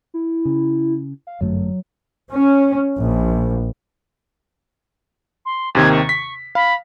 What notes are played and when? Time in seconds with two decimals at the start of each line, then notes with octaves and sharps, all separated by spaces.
0.14 E4
0.45 C#3
1.27 F5
1.41 G1 F#2 F#3 A3
2.31 C#4
2.98 A#1
5.45 C6
5.75 D#2 C3 D#3 G#6
5.91 C#6
6.09 B6
6.55 F5 B5